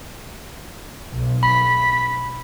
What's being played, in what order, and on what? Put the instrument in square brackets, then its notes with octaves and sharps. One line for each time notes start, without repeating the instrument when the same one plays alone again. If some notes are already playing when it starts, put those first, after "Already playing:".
[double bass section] B1
[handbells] B5 [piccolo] B6